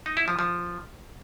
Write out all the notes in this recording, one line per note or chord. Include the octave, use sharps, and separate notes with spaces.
D#4
E4
F3
F3